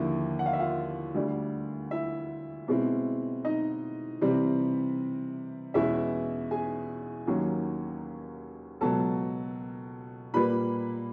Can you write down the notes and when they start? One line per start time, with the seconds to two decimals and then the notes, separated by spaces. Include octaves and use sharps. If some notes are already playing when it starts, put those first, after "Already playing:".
Already playing: D#2 D3 F3 A#3 E4
0.39 F#5
0.46 F5
0.53 E5
0.60 F4 F5
1.15 D2 D3 G3
1.91 E4 E5
2.68 B2 G#3 C4 E4
3.45 D#4 D#5
4.21 C3 E3 G3 C4
5.74 E2 B2 G#3 C#4 E4 E5
6.51 G#4 G#5
7.27 D#2 D#3 F#3 A#3 C#4
8.81 C#2 B2 F#3 A4 A5
10.34 A#2 G3 A#3 B4 B5